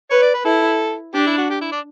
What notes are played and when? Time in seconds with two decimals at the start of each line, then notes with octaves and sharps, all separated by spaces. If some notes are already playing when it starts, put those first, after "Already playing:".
0.11 B4 C#5
0.22 D5
0.34 B4
0.45 E4 A4
1.15 D4 G4
1.27 E4
1.38 F#4
1.50 G4
1.61 E4
1.72 D4